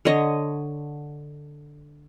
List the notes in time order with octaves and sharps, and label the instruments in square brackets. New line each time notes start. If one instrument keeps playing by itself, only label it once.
[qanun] D3 C#5 D#5